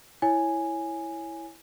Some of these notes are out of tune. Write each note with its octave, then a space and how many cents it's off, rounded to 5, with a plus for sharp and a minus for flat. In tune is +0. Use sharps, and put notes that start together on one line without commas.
E4 +0 C#5 +0 G#5 +0